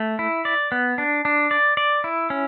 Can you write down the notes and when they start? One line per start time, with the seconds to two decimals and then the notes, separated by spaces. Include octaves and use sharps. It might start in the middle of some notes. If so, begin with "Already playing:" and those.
Already playing: A3
0.19 E4
0.45 D5
0.72 B3
0.98 D4
1.25 D4
1.51 D5
1.77 D5
2.04 E4
2.30 C#4